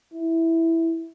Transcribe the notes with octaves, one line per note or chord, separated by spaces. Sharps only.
E4